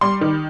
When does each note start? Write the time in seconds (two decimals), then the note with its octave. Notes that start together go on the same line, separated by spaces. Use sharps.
0.01 G3 C6
0.21 D#3